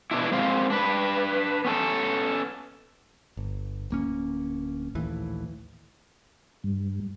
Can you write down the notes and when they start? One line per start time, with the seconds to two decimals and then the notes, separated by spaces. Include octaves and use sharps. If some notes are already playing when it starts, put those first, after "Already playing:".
0.11 B2 D4 E4
0.32 G#3 C4 F5
0.70 D4 B4
1.65 B3 C#4 G4 A4
3.37 G1
3.90 D1 A#3 C#4
4.95 A#1 D#2 A2 E3
6.64 G2